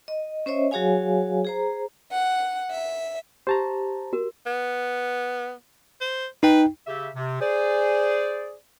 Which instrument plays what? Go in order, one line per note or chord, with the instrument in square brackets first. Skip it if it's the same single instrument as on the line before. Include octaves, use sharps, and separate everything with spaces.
[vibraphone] D#5
C#4 C5 C#5 D#5 E5
F#3 F#4 G#4 C#5 F5 G#5
G#4 C5 A#5
[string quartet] F#5
E5
[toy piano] G4 [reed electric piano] C5 A5 A#5
[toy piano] F#4 A#4
[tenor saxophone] B3
C5
[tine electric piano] D#4 G5 [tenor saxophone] B4
[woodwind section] C#3 G4 E5
C3
G#4 C5 D5